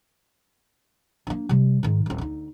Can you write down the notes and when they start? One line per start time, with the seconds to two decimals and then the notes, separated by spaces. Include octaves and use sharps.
1.27 A#3 D4
1.49 C3 G3
1.83 G#2 D#3
2.06 D#1 C4
2.18 D2 D#4